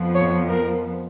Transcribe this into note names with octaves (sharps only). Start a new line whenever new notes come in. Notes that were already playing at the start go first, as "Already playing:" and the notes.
Already playing: F2 F3 B3
C#5
A#4